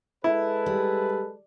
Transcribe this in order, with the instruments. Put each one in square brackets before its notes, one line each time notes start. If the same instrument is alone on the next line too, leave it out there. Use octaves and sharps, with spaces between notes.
[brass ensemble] G#3 A4 B4 [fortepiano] E4
[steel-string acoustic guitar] G3